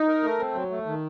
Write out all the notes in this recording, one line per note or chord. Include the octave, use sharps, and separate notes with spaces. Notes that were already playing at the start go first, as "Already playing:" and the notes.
Already playing: D#4
A#4
A3
C4
F#3
A3
D#3